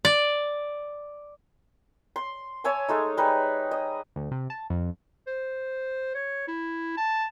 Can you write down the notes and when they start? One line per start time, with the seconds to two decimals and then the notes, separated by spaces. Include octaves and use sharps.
0.05 D5
2.16 C6
2.64 C#5 E5 G#5 A5
2.88 G#3 A3 D#4
3.17 G3 D#4 G#4 B4
3.71 D#5
4.16 D2
4.31 C3
4.50 A5
4.70 F2
5.27 C5
6.15 C#5
6.47 E4
6.97 A5